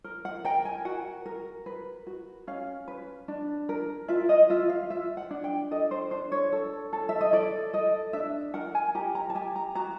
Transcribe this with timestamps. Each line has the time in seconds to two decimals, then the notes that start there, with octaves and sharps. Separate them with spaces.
0.04 A#4
0.25 F#5
0.45 A#4 G5
0.65 G#5
0.85 F#4 F#5
1.26 A#4
1.66 B4
2.07 F#4
2.47 C#4 F5
2.88 B4
3.28 D4
3.69 A#4
4.08 F4 E5
4.29 D#5
4.50 F4 E5
4.69 F5
4.90 F4 E5
5.17 F#5
5.31 D4
5.44 G5
5.71 A4 D#5
5.91 C5
6.11 D4 C5
6.32 C#5
6.52 A4
6.93 A4
7.09 E5
7.21 D#5
7.33 A4 D5
7.73 A4 D#5
8.13 D4 E5
8.54 A#4 F#5
8.75 G#5
8.95 G4 A#5
9.15 A#5
9.30 A5
9.35 G4 G#5
9.56 A#5
9.75 F#4 A#5